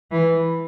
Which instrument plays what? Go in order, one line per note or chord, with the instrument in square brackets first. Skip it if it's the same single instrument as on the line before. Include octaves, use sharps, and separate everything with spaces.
[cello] E3